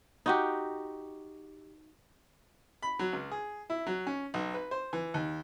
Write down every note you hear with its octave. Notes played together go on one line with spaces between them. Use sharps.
D#4 F#4 G4
B5
F#3
C#2
G#4
E4
F#3
C#4
B1
B4
C5
E3
D#2